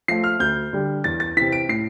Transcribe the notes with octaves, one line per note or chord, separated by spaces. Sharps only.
F3 A3 C7
F6
D2 G6
D3 G3
E2 A6
A6
C3 E3 B6
D7
A2 C7